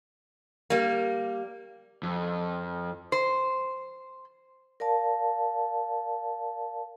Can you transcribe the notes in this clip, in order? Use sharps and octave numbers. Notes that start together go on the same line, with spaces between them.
G3 A#3
F2
C5
A#4 D5 F5 A5